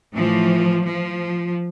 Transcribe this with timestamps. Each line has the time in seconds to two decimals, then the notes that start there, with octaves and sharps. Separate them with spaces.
0.13 A2 E3 F3
0.85 F3